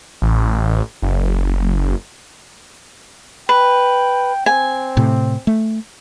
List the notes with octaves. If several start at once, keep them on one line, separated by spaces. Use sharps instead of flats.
A1
F#1
B4 G5
C4 G#5
A2 C3
A3